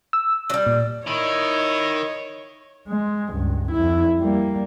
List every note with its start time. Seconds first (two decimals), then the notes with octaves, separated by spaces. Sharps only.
0.13 E6
0.50 F#3 G3
0.67 A#2
1.07 D#3 E4 C#5 D#5
2.88 G#3
3.30 C#2 G2
3.71 F2 E4
4.19 G3 A#3